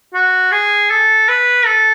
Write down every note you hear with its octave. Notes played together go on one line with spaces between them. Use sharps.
F#4
G#4
A4
B4
A4